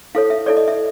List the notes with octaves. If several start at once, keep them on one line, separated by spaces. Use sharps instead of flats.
E4 A4 C#5 F5
E5
E4 A4 C#5 D5
D#5
E5